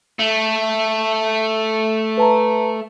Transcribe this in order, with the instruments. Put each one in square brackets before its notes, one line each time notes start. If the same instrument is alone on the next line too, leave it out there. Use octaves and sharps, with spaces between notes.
[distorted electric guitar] A3
[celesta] B4 A5 A#5